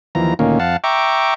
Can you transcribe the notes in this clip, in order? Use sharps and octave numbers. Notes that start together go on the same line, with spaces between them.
D#2 E3 F3 A#5
D2 A#2 D#3 A#3 C#4
F2 F5 F#5 A5
E5 G5 A#5 C#6 D6